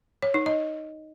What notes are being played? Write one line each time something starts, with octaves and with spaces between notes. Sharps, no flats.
C#5
D#4
D#5